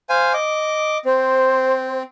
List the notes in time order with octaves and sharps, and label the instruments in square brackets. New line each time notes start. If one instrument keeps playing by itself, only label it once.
[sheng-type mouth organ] C5 F5 G#5
D#5 D6
[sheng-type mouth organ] C4 [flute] C5